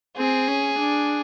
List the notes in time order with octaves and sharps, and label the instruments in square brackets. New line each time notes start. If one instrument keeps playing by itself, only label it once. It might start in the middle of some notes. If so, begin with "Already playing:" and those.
[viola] C4 [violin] G#4
[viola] C#4
D4